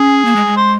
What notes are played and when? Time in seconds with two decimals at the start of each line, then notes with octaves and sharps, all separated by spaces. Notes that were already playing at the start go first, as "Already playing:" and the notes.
Already playing: C#4 G#4
0.25 A#3
0.36 G#3
0.47 G#3
0.57 C5